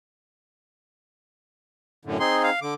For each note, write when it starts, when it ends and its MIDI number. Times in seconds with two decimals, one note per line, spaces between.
2.05 2.18 42
2.05 2.18 45
2.05 2.18 50
2.20 2.50 60
2.20 2.50 63
2.20 2.50 68
2.20 2.42 84
2.43 2.60 77
2.62 2.74 50
2.62 2.74 86